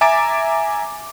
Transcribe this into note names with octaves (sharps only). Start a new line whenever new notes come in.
E5 G#5 A#5 D6 A6 D7